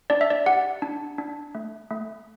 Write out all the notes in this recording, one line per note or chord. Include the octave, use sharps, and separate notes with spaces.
D4 D5
E5
D5
G4 F#5
D4
D4
A3
A3